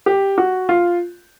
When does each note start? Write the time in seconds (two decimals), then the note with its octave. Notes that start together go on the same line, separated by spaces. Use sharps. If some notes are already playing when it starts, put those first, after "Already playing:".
0.06 G4
0.38 F#4
0.69 F4